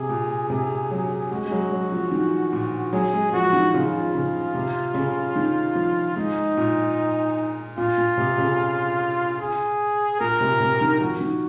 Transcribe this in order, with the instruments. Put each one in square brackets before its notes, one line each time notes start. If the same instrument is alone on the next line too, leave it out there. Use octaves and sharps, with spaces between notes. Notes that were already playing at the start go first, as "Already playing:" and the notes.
Already playing: [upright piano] C3 [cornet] G#4
[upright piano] A#2
C3
F#3
[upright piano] G#3 [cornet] F#4
[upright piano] G#3
F#3
F#3
F3
D#3
A#2
[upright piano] F#3 [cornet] G#4
[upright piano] G#3
[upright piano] F3 [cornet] F#4
[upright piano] D#3
[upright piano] C#3 [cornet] F4
[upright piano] C#3
C3
C#3
D#3
F3
[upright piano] G#2 [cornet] D#4
[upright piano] A#2
[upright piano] A#2 [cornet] F4
[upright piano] A#2
C3
C#3
[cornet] G#4
[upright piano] A#2 [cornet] A#4
[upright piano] C3
C3
D#3
[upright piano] F3 [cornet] F#4
[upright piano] D#3